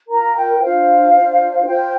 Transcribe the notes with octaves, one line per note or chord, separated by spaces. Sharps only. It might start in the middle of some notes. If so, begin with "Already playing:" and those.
F4 A#4 A#5
G5
D4 F4 C5 F5
D4 F4 C5
F4 C5 G5